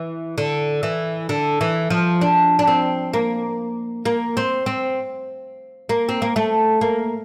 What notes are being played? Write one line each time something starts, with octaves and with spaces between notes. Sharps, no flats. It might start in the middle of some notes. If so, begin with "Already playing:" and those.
Already playing: E3
D3
E3
D3
E3
F3
D4
D4
C4
A#3
A#3
C4
C4
A#3
C4
A#3
A3
A#3